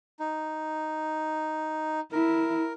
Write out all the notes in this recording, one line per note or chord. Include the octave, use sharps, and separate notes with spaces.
D#4
E4 A#4